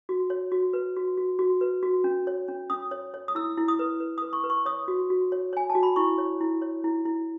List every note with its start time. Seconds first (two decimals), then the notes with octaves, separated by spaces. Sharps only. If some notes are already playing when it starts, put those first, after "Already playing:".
0.09 F#4
0.30 C#5
0.52 F#4
0.73 B4
0.96 F#4
1.18 F#4
1.39 F#4
1.61 B4
1.83 F#4
2.04 C#4
2.27 C#5
2.48 C#4
2.70 C#4 D#6
2.91 C#5
3.14 C#5
3.28 D#6
3.35 E4 E6
3.57 E4
3.68 D#6
3.79 B4
4.00 B4
4.18 B4 D#6
4.33 C#6
4.44 B4
4.50 C#6
4.66 C#5 D#6
4.88 F#4
5.10 F#4
5.32 C#5
5.53 C#5 G#5
5.70 A5
5.75 F#4
5.83 B5
5.96 E4 C#6
6.18 C#5
6.41 E4
6.62 C#5
6.84 E4
7.05 E4